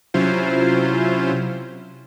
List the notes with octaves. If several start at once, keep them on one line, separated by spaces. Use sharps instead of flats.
C3 F#3 C#4 E4 F4 C5